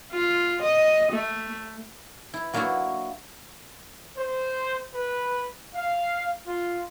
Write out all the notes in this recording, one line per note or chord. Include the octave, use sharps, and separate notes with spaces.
F4
D#5
A3
E4
F#3 A#3 D4 E4 F#4
C5
B4
F5
F4